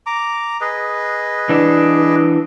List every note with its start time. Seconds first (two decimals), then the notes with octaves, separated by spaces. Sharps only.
0.06 A#5 D6
0.61 G#4 B4 D#5
1.49 E3 D4